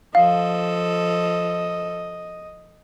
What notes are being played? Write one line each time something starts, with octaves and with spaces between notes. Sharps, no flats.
F3 A4 D#5 F5